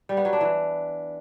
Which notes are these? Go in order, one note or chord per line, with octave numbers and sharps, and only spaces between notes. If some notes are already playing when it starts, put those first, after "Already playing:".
G3
B3
F#3
D4
E3